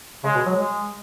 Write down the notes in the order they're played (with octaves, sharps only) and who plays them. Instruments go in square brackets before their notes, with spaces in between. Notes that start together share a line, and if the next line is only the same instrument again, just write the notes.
[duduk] C#3 [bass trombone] G#3
[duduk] B2
F#3
G#3